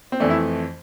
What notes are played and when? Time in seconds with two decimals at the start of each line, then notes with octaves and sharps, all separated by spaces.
0.12 C4
0.20 F2 E3 A3 D4
0.30 E4